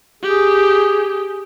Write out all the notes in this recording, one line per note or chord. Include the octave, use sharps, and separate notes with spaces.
G4 G#4